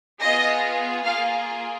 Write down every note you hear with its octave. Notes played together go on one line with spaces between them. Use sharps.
B3 F4 G#4 D#5
A#3 F4 G#4 F5